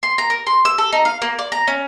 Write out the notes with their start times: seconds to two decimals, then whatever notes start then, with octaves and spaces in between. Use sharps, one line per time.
0.03 C6
0.18 A#5
0.30 A#4
0.47 C6
0.65 E6
0.78 A4
0.92 D#4
1.05 F5
1.22 A#3
1.39 D5
1.52 A#5
1.68 C#4